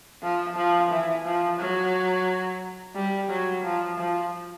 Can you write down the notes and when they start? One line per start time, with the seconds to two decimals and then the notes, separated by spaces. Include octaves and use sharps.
0.23 F3
0.56 F3
0.91 E3
1.25 F3
1.59 F#3
2.95 G3
3.29 F#3
3.64 F3
3.98 F3